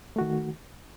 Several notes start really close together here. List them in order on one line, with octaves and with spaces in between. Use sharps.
A3 F#4 D#3